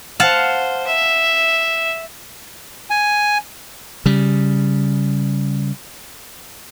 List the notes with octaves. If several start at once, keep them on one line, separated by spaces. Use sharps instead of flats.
C5 F5 F#5 A5
E5
G#5
C#3 G3